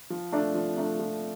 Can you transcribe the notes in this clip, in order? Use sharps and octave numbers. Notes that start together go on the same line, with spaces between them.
F3
A3 D4
F3
A3 D4
F3